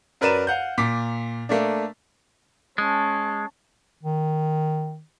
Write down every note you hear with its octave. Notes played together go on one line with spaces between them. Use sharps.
F#2 A#4 B4 D5 D#7 E7
F5 F#5 G6
A#2 D6 B6
A3 A#3 D4
G#3 C#4 A5
D#3